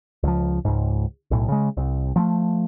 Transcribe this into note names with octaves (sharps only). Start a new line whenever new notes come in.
C#2 F3
C#2 G#2
B1 A2
C#3 G#3
C2
F3 G#3 A3